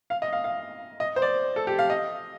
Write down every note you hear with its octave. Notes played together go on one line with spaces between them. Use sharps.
F5
D#5
F5
F5
D#5
C5
D5
A4
G4
F5
D#5